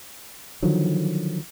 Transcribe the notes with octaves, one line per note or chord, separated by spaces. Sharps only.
D3 D#3 F3 F#3